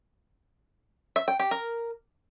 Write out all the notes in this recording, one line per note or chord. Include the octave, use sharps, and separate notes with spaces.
E5
G5
G4
A#4